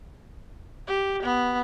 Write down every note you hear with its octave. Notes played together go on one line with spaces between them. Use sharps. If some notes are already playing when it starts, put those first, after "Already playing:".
G4
B3